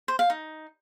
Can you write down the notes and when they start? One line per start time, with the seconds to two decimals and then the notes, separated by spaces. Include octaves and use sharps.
0.08 C5
0.19 F5
0.30 D#4